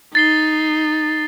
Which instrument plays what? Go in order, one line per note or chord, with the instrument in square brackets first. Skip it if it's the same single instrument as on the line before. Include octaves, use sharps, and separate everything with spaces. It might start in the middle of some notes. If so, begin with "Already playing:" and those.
[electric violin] D#4 [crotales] A6 C7 G7